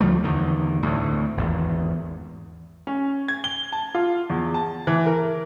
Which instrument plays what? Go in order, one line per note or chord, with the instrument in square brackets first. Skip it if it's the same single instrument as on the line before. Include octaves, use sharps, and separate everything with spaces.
[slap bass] D2 F3 G3 A3
E2 D3 D#3
D2 A2
G#1 E2
[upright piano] C#4
G#6
G7
A5
F4
E2
A5
E3
A#4